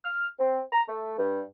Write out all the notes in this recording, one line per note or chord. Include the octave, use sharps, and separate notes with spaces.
F6
C4
A#5
A3
G2